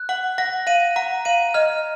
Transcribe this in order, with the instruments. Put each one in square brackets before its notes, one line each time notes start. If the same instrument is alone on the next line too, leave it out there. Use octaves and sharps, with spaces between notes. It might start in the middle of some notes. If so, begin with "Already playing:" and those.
Already playing: [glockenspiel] F#6
[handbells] F#5 [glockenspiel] F#7
[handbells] F#5 [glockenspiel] A#6
[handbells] F5 [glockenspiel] D#7
[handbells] F#5 [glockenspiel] A#5
[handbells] F5 [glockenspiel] D#7
[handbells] D#5 [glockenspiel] F6